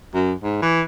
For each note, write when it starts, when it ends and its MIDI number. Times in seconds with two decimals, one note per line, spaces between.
0.14 0.33 42
0.43 0.58 44
0.62 0.81 52